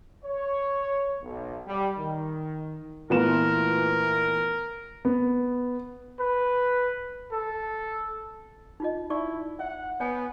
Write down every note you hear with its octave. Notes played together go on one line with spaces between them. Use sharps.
C#5
B1
G3
D#3
A#2 E3 A3 B3 F4 A#4 E7
B3
B4
A4
D#4 F4 D#5
D#4 E4 D5 C#6
E5 F#5
B3 C#5 F#5 G#5